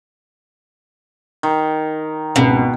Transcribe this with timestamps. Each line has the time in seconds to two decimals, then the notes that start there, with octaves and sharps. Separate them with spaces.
1.43 D#3
2.36 G#1 C#2 B2